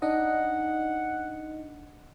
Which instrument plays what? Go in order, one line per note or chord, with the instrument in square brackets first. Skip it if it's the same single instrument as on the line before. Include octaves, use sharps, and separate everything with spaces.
[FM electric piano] D4 D#4 D#5 [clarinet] F#5